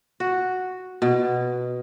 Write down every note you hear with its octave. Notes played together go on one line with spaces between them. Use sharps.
F#4
B2